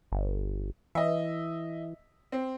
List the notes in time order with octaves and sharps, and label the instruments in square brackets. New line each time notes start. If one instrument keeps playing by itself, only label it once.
[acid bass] G1
[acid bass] E3 [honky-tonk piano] D#5 E5
[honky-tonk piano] C4